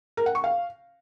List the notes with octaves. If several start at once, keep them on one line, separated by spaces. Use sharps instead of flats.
A#4
F#5
C#6
F5